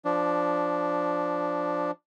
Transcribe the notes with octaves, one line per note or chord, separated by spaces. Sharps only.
F3 D4